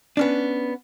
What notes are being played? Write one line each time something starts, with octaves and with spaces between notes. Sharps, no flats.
B3 C#4 D4